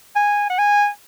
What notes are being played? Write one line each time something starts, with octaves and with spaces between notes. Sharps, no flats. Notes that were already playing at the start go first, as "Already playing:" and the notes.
G#5
F#5
G#5